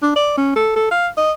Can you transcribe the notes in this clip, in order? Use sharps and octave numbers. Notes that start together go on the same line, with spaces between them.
D4
D5
C#4
A4
A4
F5
D#5